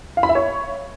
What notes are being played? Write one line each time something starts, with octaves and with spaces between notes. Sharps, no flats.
F5
B5
E5
C#5